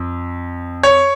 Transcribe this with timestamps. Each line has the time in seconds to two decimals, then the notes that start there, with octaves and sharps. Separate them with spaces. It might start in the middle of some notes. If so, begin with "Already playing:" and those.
Already playing: F2
0.83 C#5